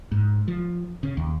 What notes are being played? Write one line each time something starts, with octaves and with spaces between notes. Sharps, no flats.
G#2
F3
C#3
D#2